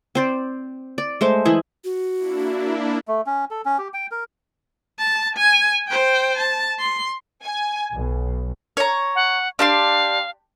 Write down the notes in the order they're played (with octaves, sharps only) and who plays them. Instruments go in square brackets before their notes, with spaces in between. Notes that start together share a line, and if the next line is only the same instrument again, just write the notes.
[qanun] C4 C5 D5
D5
G#3 A3 C5
E3 E4 G#4
[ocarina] F#4
[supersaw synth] A#3 D4 E4
[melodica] A3
C#4
A4
C#4
G4
G5
A#4
[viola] A5
G#5
C5 G5
A5
C6
[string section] G#5
B1
[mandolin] C#5 A#5
[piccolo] F#5
[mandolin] D4 G4 C6 [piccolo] F5